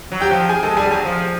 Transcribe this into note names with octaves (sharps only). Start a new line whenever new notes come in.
F#3
G4 G5
F3
G#4 G#5
G#3 A4 A5
G3 G#4 G#5
F#3 G#4 G#5
F3